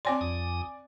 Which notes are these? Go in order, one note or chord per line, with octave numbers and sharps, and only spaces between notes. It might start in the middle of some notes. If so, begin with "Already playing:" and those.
C4 C#5 D5 G#5 C6 D6
F2 D#6